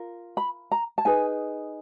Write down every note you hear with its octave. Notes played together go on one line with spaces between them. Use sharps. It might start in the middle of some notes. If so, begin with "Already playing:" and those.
Already playing: F4 A#4
B5
A#5
A5
D#4 G#4 B4 G#5